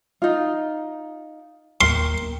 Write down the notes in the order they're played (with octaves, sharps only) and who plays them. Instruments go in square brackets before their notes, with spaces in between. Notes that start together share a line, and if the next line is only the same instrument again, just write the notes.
[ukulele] D#4 F4
[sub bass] D#2 [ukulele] A#4 G5 [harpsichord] C6